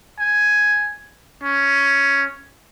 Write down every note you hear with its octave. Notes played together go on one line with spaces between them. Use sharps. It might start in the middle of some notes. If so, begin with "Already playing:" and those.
G#5
C#4